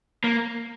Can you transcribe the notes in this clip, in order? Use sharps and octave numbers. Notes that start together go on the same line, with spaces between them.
A#3